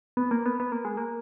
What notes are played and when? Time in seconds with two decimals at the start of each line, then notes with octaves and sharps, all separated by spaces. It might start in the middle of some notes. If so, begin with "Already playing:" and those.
0.17 B3
0.31 A#3
0.46 B3
0.60 B3
0.72 A#3
0.85 G#3
0.97 A#3